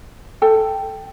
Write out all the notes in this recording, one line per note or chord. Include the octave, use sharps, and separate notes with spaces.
A4 G5